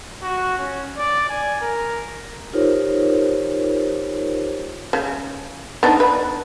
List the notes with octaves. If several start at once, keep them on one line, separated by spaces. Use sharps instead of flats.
F#4
C#4
D5
G#5
A#4
D#4 F4 G4 A#4 C5 C#5
C#3
B3 D4 D#4
B4